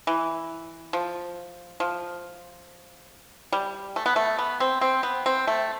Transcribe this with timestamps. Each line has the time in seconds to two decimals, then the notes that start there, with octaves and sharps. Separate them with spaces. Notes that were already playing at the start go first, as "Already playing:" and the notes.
0.07 E3
0.93 F3
1.80 F3
3.53 G3
3.96 A3
4.06 B3
4.16 A3
4.38 B3
4.60 C4
4.81 C4
5.03 B3
5.26 C4
5.47 A3